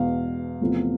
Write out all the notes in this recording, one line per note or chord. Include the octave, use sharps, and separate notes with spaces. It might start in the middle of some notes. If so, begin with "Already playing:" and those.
Already playing: E2 B2 G#3 F5
E2 C3 F3 A3